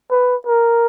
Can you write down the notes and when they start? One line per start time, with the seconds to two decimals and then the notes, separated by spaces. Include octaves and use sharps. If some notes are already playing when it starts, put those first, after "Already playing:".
0.11 B4
0.46 A#4